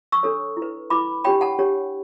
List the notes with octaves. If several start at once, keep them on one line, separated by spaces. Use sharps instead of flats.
C#6 E6
D4 A4 C#5
E4
B4
E4 B4 B5 D6
D4 G4 C#5 G5 B5
F#5 A5
D4 G4 C#5